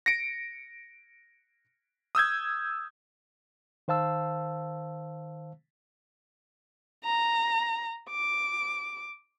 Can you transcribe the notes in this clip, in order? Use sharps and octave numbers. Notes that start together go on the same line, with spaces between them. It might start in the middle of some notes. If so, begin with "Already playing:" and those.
A#6 C#7 D7
D#6 E6 G6 G#6
D#3 C5 F5 A5 E6
A#5
D6